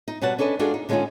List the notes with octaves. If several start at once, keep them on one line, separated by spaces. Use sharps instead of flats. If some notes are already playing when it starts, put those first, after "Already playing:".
D#4
B2 G3 B4 C#5 F#5 A5
C#4 D4 A4 B4 D#5
G#3 D4 F4 F#4 G#4 A4
D#4
D3 G#3 C#4 D#4 F4 G#4